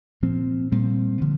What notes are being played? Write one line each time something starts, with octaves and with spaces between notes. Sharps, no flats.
A#2 F3 C4
A#2 G3 C4
D3 F3